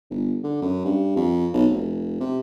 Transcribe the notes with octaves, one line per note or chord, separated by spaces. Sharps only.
G1
D3
F#2
G2
F2
B1
F1
C3